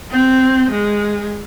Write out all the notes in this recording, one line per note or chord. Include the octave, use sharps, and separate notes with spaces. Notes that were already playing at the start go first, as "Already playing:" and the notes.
C4
G#3